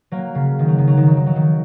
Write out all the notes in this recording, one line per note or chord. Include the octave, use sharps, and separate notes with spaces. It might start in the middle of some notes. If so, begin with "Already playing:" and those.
F#3 A#3
C#3
D#3
F#3
D#3
F#3
D#3
F#3
D#3
F#3
D#3